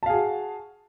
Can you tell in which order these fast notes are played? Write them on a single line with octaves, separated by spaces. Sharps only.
A5 F5 G#4 F#4